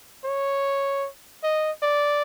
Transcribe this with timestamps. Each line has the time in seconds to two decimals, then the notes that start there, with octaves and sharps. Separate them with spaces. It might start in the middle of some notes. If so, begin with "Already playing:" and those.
0.25 C#5
1.43 D#5
1.83 D5